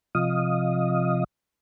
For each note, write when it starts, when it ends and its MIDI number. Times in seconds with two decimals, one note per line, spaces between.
0.15 1.24 48
0.15 1.24 53
0.15 1.24 75
0.15 1.24 77
0.15 1.24 87